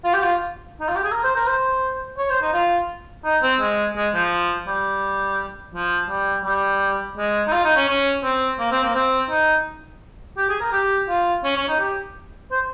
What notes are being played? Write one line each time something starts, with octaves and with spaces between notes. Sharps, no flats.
F4
G4
F4
D#4
F4
G4
G#4
A#4
C5
A#4
C5
C#5
C5
D#4
F4
D#4
C4
G#3
G#3
F3
G3
F3
G3
G3
G#3
D#4
F4
D#4
C#4
C#4
C4
A#3
C4
A#3
C4
D#4
G4
G#4
A#4
G4
F4
C#4
C#4
D#4
G4
C5